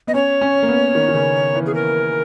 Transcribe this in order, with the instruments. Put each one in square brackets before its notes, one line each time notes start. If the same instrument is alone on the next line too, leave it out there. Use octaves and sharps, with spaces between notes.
[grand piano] B3 [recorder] D#5
[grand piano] C#4 [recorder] C#5
[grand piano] C#4
A#3
B3
D#3
D#3
C#3
E3
[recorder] G#4
A#4